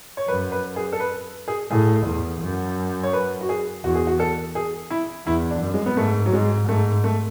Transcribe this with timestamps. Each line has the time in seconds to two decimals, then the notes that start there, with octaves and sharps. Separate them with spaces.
0.17 C#5
0.28 F#2 B4
0.52 B4
0.76 G#4
0.93 A4
1.00 B4
1.48 G#4
1.71 A2 G#4
2.07 E2
2.42 F#2
3.03 C#5
3.13 B4
3.41 F#4
3.49 G#4
3.84 E2 F#4
3.95 G#4
4.07 F#4
4.20 A4
4.55 G#4
4.90 E4
5.26 E2 E4
5.51 D4
5.61 F#2
5.74 G#3
5.86 B3
5.97 G#2 A3
6.26 F#3
6.33 G#2 G#3
6.68 G#2 A3
7.04 A3